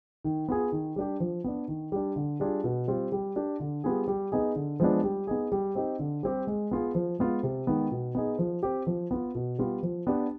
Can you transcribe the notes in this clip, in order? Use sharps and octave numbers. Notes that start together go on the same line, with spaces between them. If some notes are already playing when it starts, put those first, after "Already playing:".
D#3
B3 F4 G#4
D#3
G3 D4 G4
F3
B3 D4
D#3
G3 D4
D3
G3 D4 F4 G#4
B2
G3 C4 F4
G3
D4 G4
D3
G3 B3 F4 G#4
G3
B3 D#4 G#4
D3
F3 G#3 B3 D4
G3
B3 D#4 G#4
G3
C4 D#4 G4
D3
G3 C4 G4
G#3
B3 F4 G#4
F3
G#3 B3 F4
C3
D#3 G#3 B3
B2
B3 D#4 G#4
F3
C4 G4
F3
B3 F4
B2
G3 B3 F4
F3
B3 D4 G4